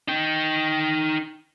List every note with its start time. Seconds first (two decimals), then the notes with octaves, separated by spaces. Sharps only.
0.08 D#4 G5